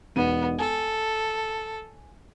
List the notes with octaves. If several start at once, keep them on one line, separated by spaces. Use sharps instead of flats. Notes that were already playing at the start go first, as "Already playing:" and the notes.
E1 B3 D#4 D#7
A4 G#5